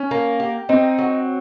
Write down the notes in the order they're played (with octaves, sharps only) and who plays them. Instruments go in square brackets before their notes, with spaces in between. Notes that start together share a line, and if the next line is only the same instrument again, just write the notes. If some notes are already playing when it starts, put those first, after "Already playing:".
Already playing: [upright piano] C#4
[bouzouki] A#3
G4
[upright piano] C4 [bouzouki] D#4
[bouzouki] F#3